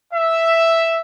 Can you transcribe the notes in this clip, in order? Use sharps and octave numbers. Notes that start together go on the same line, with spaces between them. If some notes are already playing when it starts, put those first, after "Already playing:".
E5